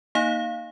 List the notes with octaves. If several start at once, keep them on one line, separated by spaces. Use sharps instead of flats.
A#3 D#4 F5